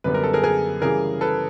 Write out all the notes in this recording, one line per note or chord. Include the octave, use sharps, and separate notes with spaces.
F#2 D3 G3 B3 B4
A#4
A4
G#4 A#4
G#4 A#4
C#3 E3 G3 G#4 A#4
A4 B4